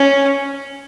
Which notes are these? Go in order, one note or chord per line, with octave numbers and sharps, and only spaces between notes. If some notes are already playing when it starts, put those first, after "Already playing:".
Already playing: C#4